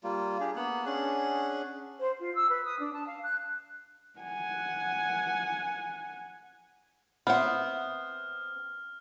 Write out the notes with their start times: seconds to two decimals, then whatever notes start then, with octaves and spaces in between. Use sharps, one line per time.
0.04 G3 A#3 F4
0.40 D4 G4 G#4
0.56 A#3 B3 F#5
0.86 C#4 D4 G#4 F#5
2.00 C5
2.20 F4
2.35 E6
2.49 B4
2.65 D#6
2.79 D4
2.93 A5
3.07 F5
3.23 F#6
4.20 F#5 G#5
7.27 B3 C4 E5 F#5 F6